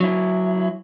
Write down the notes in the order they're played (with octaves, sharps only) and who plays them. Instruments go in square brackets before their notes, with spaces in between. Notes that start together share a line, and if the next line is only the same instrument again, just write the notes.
[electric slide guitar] F#3 E4